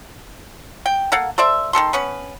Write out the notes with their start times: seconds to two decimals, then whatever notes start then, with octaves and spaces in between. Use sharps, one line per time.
0.86 G5
1.12 A#3 A4 F5 F#5
1.38 A4 C5 D5 E5
1.73 D#3 C4 A4 C6
1.93 B3 C#4 B4